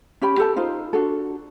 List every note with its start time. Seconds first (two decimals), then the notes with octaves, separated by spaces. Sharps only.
0.21 C#4 G4 G5 B5
0.37 G4 A4 A5
0.56 D#4 F4 C5
0.93 D4 F#4 A4